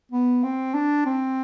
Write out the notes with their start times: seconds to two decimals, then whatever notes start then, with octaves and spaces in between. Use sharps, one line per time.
0.12 B3
0.44 C4
0.74 D4
1.06 C4